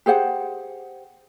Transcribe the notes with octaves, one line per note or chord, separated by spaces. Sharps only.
G4 G#4 C5 F#5